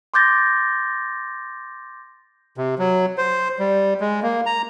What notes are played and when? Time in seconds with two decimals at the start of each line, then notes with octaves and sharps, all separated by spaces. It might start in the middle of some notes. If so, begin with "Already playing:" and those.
0.14 C6 D6 G6 A6 A#6
2.57 C3
2.79 F#3
3.18 C5
3.59 G3
4.01 G#3
4.23 A#3
4.46 A#5